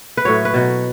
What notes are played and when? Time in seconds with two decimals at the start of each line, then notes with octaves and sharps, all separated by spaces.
0.17 B4
0.25 A2 F#3 C#5
0.45 B4
0.54 B2 F#3